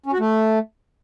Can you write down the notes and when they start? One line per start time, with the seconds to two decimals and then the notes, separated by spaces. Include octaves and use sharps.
0.06 C#4
0.13 F#4
0.19 A3